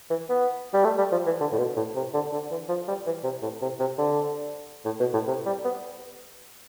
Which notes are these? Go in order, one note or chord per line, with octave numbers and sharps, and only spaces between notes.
E3
B3
G3
A3
G3
F3
E3
D3
A2
B2
A2
C3
D3
D3
E3
F3
G3
E3
C3
A2
C3
C3
D3
A2
B2
A2
C3
G3
B3